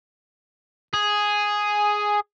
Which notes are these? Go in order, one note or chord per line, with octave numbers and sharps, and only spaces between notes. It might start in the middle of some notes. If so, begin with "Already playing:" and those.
G#4